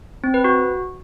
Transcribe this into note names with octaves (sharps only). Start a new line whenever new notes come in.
C4
B4
F#4